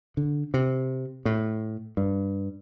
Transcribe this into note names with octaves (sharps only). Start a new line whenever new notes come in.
D3
C3
A2
G2